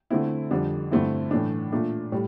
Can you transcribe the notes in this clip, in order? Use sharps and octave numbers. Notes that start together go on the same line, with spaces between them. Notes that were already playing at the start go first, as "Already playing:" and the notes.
D3 A3 C4 E4
F2 D3 G3 D4
G2 D3 A3 C4 E4
A2 E3 A3 D4
A#2 A3 D4
A2 G3